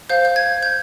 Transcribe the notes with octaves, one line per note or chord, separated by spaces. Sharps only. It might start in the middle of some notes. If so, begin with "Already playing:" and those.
C5 F5 G6
G6
G#6
G6